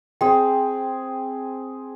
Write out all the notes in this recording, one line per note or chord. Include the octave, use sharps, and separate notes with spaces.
C4 G#4 G5